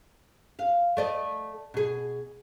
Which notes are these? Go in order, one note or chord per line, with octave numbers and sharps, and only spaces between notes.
F5
A3 D5 D#5
B2 G#4